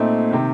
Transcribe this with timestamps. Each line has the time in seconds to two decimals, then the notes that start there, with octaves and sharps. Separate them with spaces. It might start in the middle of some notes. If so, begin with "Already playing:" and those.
Already playing: A#2 A3 C4 D#4
0.31 C3 D#3